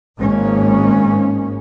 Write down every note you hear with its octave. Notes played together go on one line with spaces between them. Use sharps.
G#1 G#2 G#3 A#3 C#4